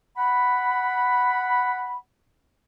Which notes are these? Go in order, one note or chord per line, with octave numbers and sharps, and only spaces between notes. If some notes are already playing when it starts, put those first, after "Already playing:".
F#5 B5